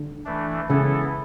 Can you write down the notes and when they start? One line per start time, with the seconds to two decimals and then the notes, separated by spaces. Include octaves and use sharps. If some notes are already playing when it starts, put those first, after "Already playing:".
Already playing: D3
0.25 E3 A3 D4
0.69 C#3 E3 B3 E4 A4